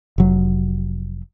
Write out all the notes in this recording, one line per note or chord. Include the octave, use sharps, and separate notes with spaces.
F1 F#3